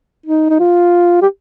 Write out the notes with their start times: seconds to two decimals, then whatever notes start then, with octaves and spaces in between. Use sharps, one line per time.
0.26 D#4
0.50 D#4
0.60 F4
1.22 G4